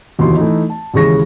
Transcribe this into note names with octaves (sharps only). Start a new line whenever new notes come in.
F1 D#2 B2 E3 D#4 C6
E3 A3 D#4
A5
D#2 C#3 E3 G#3 C#6 A#6